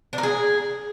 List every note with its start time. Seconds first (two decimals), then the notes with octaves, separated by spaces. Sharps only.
0.13 D4
0.18 A#4
0.23 G#4